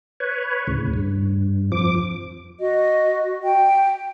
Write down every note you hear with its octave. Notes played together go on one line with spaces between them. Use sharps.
B4 C#5
D2 A2 C#3
G2
F2 F3 D6
F#4 D#5
G5